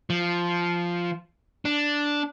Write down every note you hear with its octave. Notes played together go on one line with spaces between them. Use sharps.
F3
D4